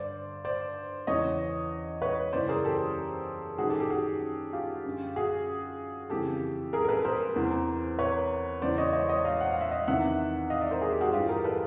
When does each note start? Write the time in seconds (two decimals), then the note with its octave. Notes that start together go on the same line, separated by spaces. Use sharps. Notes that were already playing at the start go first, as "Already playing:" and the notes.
Already playing: G2 D3 C5 D5
0.45 C5 D5
1.07 E2 C#3 E3 C#5 D#5
2.02 B4 C#5
2.33 F#2 C#3 E3 C5 D5
2.49 G#4 A#4
2.65 G4 A4
3.58 F#2 D#3 F#4 G#4
3.69 G4 A4
3.80 G4 A4
3.90 F#4 G#4
4.53 F4 G4
4.85 F#2 D3
5.16 F#4 G#4
6.10 F2 C#3 E3 G4 A4
6.73 G#4 A#4
6.84 A#4
6.89 A4 B4
7.05 A#4 C5
7.36 E2 C3 E3
7.99 B4 C#5
8.62 E2 C#3 E3 C5 D5
8.78 C#5 D#5
8.93 C#5 D#5
9.09 C#5 D#5
9.25 D#5 F5
9.40 F#5
9.51 F5
9.61 E5
9.71 D#5 F5
9.88 E2 C3 D#3 E5 F#5
10.50 D#5 F5
10.61 D5 E5
10.71 A#4 C5
10.82 G#4
10.92 G4
11.01 F#4 G#4
11.13 G2 E3 F4 G4
11.29 G#4 A#4
11.44 A4 B4